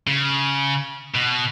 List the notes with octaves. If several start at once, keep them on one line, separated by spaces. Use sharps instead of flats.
C#3
B2